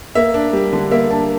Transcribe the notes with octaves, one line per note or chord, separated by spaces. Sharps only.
A#3 E5
D4
G3
D3
A#3 E5
D4 A5